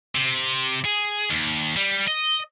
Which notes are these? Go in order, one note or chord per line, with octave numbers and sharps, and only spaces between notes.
C3
G#4
D#2
G3
D#5